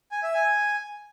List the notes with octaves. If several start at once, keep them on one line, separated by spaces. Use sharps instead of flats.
G#5
E5
G#5